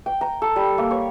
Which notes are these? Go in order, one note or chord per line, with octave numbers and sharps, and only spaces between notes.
G5
A#5
A4
G3
A#3
C#5